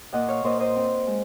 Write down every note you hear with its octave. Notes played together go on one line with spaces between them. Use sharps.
A#2 D#5 F#5
C#5 F5
A#2 C5 D#5
C5 D#5
C4
G#3